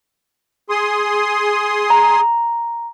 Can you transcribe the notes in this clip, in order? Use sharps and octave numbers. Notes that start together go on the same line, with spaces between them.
G#4 C6 D#6
A#5